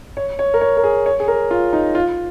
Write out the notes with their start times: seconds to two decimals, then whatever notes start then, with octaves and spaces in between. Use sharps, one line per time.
0.17 C#5
0.39 C#5
0.54 A#4
0.61 C#5
0.77 A#4
0.84 G#4
1.06 C#5
1.20 G#4
1.28 A#4
1.51 F4
1.73 D#4
1.95 F4